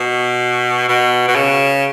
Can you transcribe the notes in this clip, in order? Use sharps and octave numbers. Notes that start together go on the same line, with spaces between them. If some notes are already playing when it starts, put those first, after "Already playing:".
Already playing: B2
B2
B2
C#3